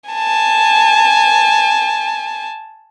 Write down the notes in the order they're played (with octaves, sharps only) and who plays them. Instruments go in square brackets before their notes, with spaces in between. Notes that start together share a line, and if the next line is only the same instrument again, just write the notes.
[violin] G#5 A5